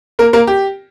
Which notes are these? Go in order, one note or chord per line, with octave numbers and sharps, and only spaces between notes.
A#3 A#4
A#3 A#4
G4